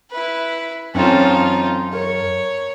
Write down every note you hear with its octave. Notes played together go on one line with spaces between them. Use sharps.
E4 B4
F#2 C4 C#4 D#4 F4 A4
A#4 C#5